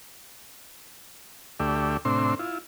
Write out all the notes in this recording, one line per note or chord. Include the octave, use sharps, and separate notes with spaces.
D2 A3 G4 D5 E5
A2 C3 C4 D4 E5 C6
E4 F4